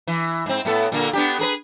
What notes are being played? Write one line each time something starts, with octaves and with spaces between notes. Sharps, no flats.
E3
G#2 C4
A2 B3 A4
A#2 D3 A#3
B3 D4 G4
G#4 A#4 B4